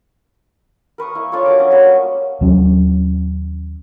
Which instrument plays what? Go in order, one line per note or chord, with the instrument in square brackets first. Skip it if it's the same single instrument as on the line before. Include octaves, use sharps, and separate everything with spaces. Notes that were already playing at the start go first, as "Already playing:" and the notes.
[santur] A#4 B4 C#6 D#6
A#3 E4 D#5
D4 F4 A4 C#5
F#3 D4 D6
A3 C#4 D#6
G3 A#3 C#4 F#4
[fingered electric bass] D#2 F#3 C#4